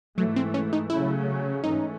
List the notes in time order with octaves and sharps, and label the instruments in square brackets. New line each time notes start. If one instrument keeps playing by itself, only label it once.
[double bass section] G#2 E3 A3 [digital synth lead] F#3
[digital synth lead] C4
C#4
D#4
[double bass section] C#3 F#3 A3 C#4 [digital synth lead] E4
[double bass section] G#2 E3 A3 C#4 [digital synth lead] D#4